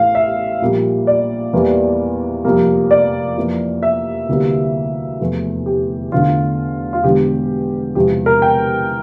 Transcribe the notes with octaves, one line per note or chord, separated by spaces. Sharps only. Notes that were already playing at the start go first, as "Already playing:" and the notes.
Already playing: A1 A2 E3 A3 F5
E5
A#1 A#2 G3 A#3
D5
E2 E3 G3 A#3
F1 F2 C3 G3 A#3
D5
F2 E3 A#3
E5
D2 C3 E3 G3 A#3
F1 E2 E3 A3
G4
E2 D3 A3 F4
F4
E1 E2 D3 G4
E1 E2 C3 F3 G4
A#4
G5